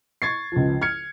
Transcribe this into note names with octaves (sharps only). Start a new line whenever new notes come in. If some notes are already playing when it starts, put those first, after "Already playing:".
C#6 G#6 A6 C7
C#2 F3
F6 G#6 C#7